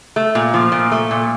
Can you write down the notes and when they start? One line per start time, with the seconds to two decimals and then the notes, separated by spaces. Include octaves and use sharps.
0.16 A3
0.35 A#2
0.54 F3
0.72 A#2
0.92 A3
1.11 A#2